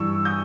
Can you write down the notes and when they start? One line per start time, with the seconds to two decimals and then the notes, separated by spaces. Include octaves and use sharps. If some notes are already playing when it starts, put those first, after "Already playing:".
Already playing: G2 E3 C#6 E6
0.25 D#6 G6